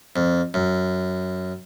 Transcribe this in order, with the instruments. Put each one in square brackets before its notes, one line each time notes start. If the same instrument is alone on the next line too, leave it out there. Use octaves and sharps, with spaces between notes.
[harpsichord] F2
F#2